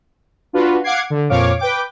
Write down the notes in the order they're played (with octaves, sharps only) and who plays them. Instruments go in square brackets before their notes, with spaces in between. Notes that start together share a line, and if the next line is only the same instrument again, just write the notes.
[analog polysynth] D4 F4 F#4 B4
F5 F#5 D6 G#6 C7
D3
F2 A#2 F3 C#5 F5 D6
B4 G5 D6